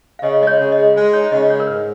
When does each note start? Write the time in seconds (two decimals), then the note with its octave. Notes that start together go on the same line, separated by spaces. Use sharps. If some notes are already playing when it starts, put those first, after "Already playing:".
0.19 F5
0.23 C#3 D#5
0.41 G#3 D#5
0.47 C#5
0.60 C#3
0.72 D#5
0.78 G#3
0.96 G#3
1.13 D#4 C#5
1.32 C#3 D#5
1.50 G#3 C#5
1.60 A#4
1.67 G#2 B4